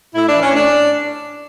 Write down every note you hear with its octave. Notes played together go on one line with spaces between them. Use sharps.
A2 E4
E3 D4
C#4
A2 D4